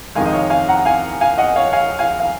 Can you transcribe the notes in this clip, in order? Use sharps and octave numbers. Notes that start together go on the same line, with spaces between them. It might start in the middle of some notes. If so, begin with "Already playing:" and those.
F2 C3 D#3 G#3 F5 G#5
D#5
C#5 F5
F5 G#5
F#5 A#5
F5 G#5
F5 G#5
D#5 F#5
C#5 F5
F5 G#5
F5 G#5
F5